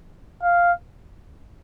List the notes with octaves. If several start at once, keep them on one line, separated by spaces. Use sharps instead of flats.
F5